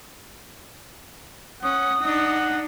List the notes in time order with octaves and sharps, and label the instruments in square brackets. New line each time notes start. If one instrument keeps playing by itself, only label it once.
[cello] C#4 [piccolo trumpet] F#5 [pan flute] D#6
[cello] D4 D#4 [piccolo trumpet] F#5